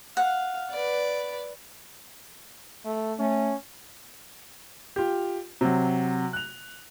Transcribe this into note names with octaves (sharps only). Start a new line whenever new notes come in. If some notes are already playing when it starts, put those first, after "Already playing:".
F5 F#5
B4 D5
A3
A3 C#4
F4 G4
C3 F#3
F#6 F7